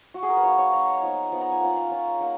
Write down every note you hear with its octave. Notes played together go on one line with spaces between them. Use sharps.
F#4
G#4
A#4
B4
F#3 A#3 D#4 C#5
C#5
F#3 A#3 D#4 A#5
F3 B3 D#4
F3 B3 D#4 B5
A#5
G#5
A#3 C#4 F4 F#5
F5
A#3 C#4 F4
A#3 D#4 F#5